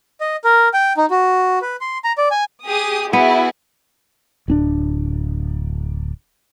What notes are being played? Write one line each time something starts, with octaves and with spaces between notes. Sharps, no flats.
D#5
A#4
G5
D#4
F#4
B4
C6
A#5
D5
G#5
G4 G#4 D#6
B3 E4 F#4 G#4
D1 C#4 D4